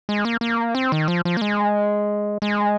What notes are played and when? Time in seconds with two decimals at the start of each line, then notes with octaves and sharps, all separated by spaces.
0.09 G#3
0.25 A#3
0.41 A#3
0.75 C4
0.92 D#3
1.08 F3
1.25 F3
1.37 A#3
1.42 G#3
2.42 G#3